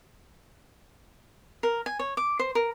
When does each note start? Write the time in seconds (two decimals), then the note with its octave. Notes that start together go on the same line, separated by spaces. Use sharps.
1.63 A#4
1.86 G#5
1.99 C#5
2.17 D6
2.39 C5
2.55 A#4